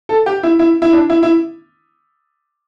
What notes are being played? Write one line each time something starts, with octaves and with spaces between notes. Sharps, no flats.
A4
G4
E4
E4
E4
D4
E4
E4